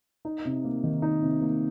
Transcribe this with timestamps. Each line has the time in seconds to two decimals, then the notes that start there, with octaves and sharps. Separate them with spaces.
0.25 D#4
0.45 C3
0.64 A#3
0.84 D#3
1.02 D#4
1.22 C3
1.42 A#3